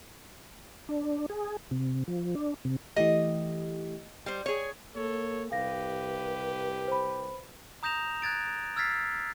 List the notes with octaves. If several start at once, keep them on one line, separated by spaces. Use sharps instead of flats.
D4
G#4
C3
F3
D4
C3
E3 A3 G4 D#5
G3 C5 G5
G#4 C#5
A#3 A4 C#5
C2 G4 B4 F5 A#6
C5 B5
A#5 D#6 G6 A#6 E7 F7
F#6 G#6 A6 D7
E6 F6 G#6 A6 B6 C7